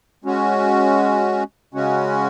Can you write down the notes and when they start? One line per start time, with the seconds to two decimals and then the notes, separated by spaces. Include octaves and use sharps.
0.24 G#3 C#4 F#4
1.73 C#3 G#3 C#4 F#4